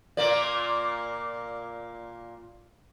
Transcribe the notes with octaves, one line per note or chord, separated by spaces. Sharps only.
A#2 A#3 D5